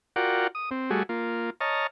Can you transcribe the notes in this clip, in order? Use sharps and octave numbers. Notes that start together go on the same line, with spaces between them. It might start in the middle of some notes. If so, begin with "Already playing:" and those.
F4 F#4 A#4 D5 F#5 G5
D#6
C4
G3 A3 F#4 G#4
A#3 F4
C#5 D#5 A5 A#5 F6